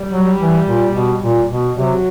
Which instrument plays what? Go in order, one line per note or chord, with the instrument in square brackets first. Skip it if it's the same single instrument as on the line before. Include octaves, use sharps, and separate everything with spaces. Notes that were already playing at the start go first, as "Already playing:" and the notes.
Already playing: [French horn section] G3
[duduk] F#3
E3
A#2
B2
A#2
B2
[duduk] C3 [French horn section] F#3